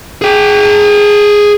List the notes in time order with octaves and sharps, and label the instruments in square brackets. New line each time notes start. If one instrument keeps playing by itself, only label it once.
[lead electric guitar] G#4 G5